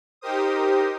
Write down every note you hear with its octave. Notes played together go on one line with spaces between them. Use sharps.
D#4 G4 A#4 C5 D#6